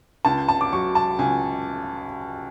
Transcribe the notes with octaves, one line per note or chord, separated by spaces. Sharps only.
C#2 A5
A5
D6
F#3 C#6
A5
C#2 G#5